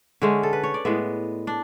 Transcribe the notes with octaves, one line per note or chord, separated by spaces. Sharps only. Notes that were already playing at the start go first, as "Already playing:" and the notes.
D3 G#3 C#4 E5
A4
B4
C#5
D5
A2 G#3 B3 E5
D4